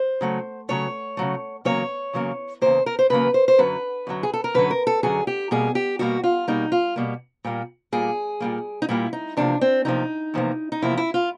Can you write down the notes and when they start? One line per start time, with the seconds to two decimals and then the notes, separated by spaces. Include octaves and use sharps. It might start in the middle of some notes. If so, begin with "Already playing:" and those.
Already playing: C5
0.21 C#3 F#3 A3
0.69 C#3 F#3 A3 C#5
1.17 C#3 F#3 A3
1.65 E2 C#3 F#3 A#3 C#5
2.13 E2 C#3 F#3 A#3
2.61 E2 C#3 F#3 A#3 C5
2.86 A#4
2.99 C5
3.10 E2 C#3 F#3 A#3 B4
3.34 C5
3.48 C5
3.58 F#2 D3 F#3 B4
4.07 F#2 D3 F#3
4.23 G#4
4.33 A4
4.44 A#4
4.54 F#2 D3 F#3 B4
4.71 A#4
4.87 A4
5.03 F#2 D3 F#3 G#4
5.27 G4
5.51 B2 G3 A#3 G#4
5.75 G4
5.99 B2 G3 A#3 F#4
6.24 F4
6.48 B2 G3 A#3 D#4
6.72 F4
6.96 B2 G3 A#3
7.44 A#2 G3 A#3
7.92 A#2 G3 A#3 G#4
8.40 A#2 G3 A#3
8.82 D#4
8.89 A#2 G3 A#3 E4
9.13 D#4
9.37 E2 C3 F3 A#3 D4
9.61 C4
9.85 E2 C3 F3 A#3 D#4
10.34 E2 C3 F3 A#3
10.72 D#4
10.82 E2 C3 F3 A#3 E4
10.97 E4
11.14 F4